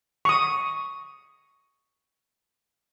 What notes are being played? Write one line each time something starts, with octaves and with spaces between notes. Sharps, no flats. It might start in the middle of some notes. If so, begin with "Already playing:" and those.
C#6 D#6